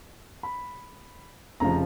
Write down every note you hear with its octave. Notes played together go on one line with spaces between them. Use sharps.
B5
F1 C#3 F3 A#5